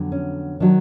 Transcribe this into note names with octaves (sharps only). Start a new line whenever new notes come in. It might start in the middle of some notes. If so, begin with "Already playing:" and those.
Already playing: F2 D3 F#3 B3
C#4
D#3 F#3 D4